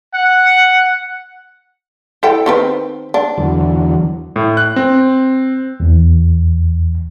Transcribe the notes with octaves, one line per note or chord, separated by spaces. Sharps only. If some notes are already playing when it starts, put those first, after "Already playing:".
F#5
E4 A4 G5
D#3 C4 B4
D4
E2 D3 F#3
A2
F#6
C4
E2